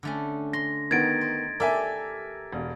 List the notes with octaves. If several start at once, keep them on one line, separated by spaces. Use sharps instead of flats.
D3 A3 C#4
C6 A#6
D#3 B3 D#4 G#6 A6 D7
C5
G4 A4 A#4 D5 E5 G#5
E1